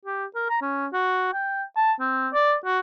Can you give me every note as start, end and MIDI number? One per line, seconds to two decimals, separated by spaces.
0.05 0.25 67
0.35 0.45 70
0.49 0.57 82
0.61 0.87 61
0.93 1.29 66
1.33 1.63 79
1.76 1.92 81
2.00 2.29 60
2.33 2.54 74
2.65 2.79 66